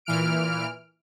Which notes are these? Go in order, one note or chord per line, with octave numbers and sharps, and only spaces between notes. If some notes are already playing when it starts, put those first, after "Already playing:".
A#2 E3 F6 D7